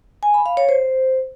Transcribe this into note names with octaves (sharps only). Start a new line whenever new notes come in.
G#5
B5
F5
C#5
C5